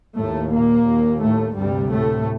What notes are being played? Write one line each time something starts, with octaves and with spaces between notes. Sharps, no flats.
D#2 A2 A3
A#2 A#3
D#2
A2 A3
D2 G2 C3 G3
A2 A3